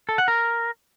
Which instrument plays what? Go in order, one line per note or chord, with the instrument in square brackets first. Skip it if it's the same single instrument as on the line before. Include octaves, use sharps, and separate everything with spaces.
[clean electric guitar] A4
F#5
A#4